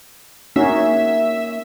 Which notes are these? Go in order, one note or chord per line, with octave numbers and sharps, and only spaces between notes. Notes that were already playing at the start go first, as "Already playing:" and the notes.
A#3 C#4 D#4 F#4 E5